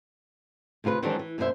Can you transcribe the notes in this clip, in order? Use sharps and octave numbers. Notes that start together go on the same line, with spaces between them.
D2 C3 F4 A#4 B4
D#3 E3 F#3 G#3 C4 D4
E3
F#2 B2 A#3 C#4 C5 E5